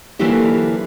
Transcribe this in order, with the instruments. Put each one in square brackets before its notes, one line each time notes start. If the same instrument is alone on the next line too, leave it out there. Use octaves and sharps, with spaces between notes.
[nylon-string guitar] D3 E3 F#3 A#3 E4 G4